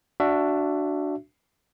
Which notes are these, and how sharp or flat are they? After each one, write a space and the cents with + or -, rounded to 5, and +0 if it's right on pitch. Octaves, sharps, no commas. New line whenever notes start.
D4 +0 F#4 +0 E5 +20